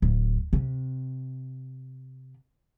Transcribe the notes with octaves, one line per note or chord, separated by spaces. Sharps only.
D1
C3